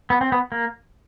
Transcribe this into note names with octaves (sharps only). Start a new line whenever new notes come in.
B3
C4
B3
A#3